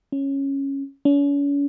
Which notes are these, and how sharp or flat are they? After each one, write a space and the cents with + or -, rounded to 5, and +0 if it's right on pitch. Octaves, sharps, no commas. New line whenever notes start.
C#4 -10
C#4 +40